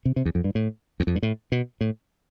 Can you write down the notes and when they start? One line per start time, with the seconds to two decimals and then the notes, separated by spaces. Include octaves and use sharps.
0.05 C3
0.16 C3
0.25 E2
0.35 F2
0.44 G2
0.55 A2
1.00 E2
1.07 F2
1.16 G2
1.23 A2
1.52 B2
1.81 A2